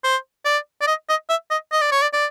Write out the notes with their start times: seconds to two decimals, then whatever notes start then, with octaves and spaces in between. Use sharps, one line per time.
0.04 C5
0.45 D5
0.81 D5
0.87 D#5
1.09 D#5
1.29 E5
1.51 D#5
1.72 D#5
1.81 D5
1.92 C#5
2.02 D5
2.13 D5